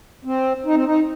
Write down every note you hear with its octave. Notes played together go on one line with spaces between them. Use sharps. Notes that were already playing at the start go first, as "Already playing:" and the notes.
C4
D#4
C4
D#4